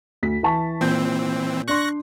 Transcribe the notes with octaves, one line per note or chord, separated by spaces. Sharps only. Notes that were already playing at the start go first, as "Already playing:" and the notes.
D2 B6
E3 A5 C#6
A#2 E3 C4 G6
D4 D5 C6 C#6 F#6 A#6